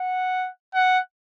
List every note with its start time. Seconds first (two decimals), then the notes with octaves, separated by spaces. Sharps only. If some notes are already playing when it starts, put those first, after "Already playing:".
Already playing: F#5
0.74 F#5